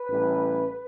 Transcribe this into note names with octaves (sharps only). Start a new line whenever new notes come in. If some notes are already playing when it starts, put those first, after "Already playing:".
Already playing: B4
A1 A2 G3